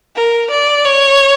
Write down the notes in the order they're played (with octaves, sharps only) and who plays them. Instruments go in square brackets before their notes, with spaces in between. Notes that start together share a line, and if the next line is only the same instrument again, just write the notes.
[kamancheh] A#4
D5
C#5